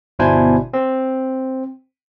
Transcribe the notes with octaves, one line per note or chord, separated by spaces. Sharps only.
G1 B2 D4 E4 C5 G#5
C4